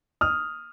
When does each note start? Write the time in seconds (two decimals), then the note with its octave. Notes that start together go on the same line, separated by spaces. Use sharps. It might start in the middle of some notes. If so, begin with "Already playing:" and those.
0.21 D#6 F6